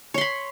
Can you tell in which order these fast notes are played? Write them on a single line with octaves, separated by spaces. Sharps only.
C#5 C6 B5